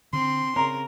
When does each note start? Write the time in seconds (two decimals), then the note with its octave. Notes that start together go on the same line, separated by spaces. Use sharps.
0.13 D3 C4 C6
0.56 C#3 C4 A#4 A#5